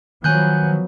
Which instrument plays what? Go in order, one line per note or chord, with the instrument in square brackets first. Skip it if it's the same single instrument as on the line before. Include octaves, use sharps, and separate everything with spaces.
[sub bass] D#3 [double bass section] F3 F#3 B3 [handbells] G#5 F#6 G6